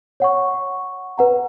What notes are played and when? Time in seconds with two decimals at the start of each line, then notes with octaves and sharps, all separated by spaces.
0.20 C#5 F#5 C#6
1.18 B4 F#5 A#5